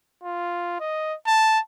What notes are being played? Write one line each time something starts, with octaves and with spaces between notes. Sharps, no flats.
F4
D#5
A5